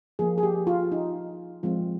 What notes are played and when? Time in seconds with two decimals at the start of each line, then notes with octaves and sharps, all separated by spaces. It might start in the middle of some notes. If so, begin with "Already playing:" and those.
0.19 F3 A#3 G#4
0.38 G#4
0.43 G4
0.67 F4
0.92 D#4
1.63 F3 G#3 C4 F4